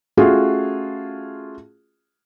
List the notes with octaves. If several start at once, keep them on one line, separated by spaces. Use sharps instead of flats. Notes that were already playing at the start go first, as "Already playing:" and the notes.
A3 C#4 F4 F#4 G#4